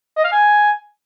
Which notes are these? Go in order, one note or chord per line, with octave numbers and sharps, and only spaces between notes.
D#5
F5
G#5